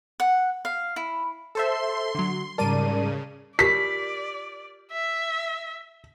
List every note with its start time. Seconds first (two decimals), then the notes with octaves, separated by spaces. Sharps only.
0.20 F#5
0.65 F5
0.96 E4
1.55 A4 C5 E5 C6
2.15 D3 F#3
2.58 G#2 C#3 G3 A#4 D5 A5 D#7
3.59 F4 G4 A#4 D5 B6
4.92 E5